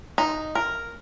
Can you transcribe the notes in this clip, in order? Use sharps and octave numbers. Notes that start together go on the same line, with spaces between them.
D#4
A#4